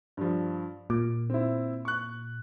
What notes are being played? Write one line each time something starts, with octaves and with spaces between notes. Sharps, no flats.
G2 F3
A#2 D6
C4 E4
C#6 F#6